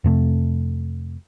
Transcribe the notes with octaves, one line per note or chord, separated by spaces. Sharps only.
F2 C3 A3